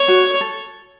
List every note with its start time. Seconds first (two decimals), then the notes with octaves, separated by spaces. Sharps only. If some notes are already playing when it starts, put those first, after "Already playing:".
Already playing: C#5
0.08 F#4
0.41 A4